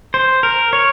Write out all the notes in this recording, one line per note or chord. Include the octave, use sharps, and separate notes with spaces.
C5
A#4
C#5